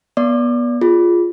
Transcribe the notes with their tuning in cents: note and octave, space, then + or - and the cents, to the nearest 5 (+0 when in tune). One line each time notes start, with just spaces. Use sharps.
B3 -25 D5 -20 D6 +35
F4 +0 G#4 +0